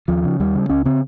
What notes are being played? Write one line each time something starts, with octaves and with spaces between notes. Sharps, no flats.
D#2 F3
C#3
D#2 G3
C#3
C#2 C#4
C#3 C4